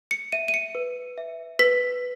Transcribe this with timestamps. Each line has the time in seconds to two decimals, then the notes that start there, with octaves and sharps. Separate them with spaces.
0.11 C#7
0.32 E5 D#7
0.48 D#7
0.54 C#7
0.75 B4
1.18 E5
1.59 B4 B6